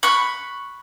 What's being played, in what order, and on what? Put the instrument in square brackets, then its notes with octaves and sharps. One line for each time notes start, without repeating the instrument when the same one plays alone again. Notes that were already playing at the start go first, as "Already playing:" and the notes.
[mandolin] B5 C#6 F#6